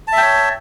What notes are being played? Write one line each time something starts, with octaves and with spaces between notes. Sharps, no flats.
C#5 E5 G5 A5